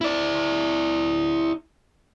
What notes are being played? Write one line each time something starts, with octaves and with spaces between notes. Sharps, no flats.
E4 D5